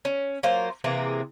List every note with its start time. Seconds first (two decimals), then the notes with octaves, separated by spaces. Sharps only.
0.05 C#4
0.43 F#3 A#3 F4 C5
0.84 C3 E3 A#3 G#4